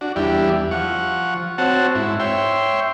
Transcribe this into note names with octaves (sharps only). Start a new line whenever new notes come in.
D4 F#4
E2 G3 D4 E4 G4
F3 F#5 C#6
C4 F#4 C#5 F#5 A5
G#2 E4
C#5 E5 G5 C6